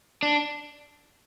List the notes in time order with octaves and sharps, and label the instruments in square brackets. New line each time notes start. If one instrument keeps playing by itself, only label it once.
[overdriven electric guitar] D4